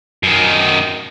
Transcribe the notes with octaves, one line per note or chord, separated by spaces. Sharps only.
F#2 D#3